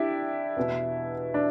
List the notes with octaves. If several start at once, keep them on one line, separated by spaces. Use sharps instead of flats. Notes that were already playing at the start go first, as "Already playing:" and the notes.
Already playing: D4 E4 G4
E2 B2
D4